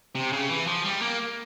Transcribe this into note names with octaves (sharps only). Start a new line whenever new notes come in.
C3
C#3
E3
F3
G3
A#3